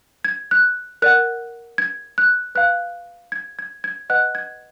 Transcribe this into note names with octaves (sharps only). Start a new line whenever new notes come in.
G#6
F#6
A#4 D5 F#5 F#6
G#6
F#6
B4 F5 F#6
G#6
G#6
G#6
B4 D#5 F#5 F#6
G#6